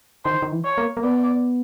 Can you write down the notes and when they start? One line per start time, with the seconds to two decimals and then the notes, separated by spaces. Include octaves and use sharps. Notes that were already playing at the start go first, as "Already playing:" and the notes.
0.25 D#3 C5
0.42 D#3
0.52 E3
0.64 C#5
0.78 A#3
0.97 A#3
1.03 B3 D5